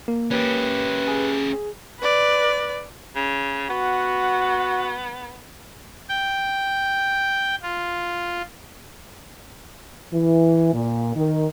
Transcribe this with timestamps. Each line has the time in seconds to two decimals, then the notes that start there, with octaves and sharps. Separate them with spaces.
0.08 A#3
0.31 C#4 G4 B4
1.08 G#4
1.99 B4 D5
3.16 C#3
3.70 B3 F#4
6.09 G5
7.62 F4
10.13 E3
10.74 A#2
11.16 D#3